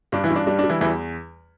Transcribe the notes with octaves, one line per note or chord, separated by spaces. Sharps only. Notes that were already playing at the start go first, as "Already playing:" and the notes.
G2 D4
E3 E4
G2
D4
G3 D4
D4
G3
E3 E4
E2 E3 E4